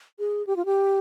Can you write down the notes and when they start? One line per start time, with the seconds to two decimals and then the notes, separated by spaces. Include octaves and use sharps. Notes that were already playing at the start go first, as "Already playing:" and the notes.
0.19 G#4
0.47 G4
0.56 F4
0.65 G4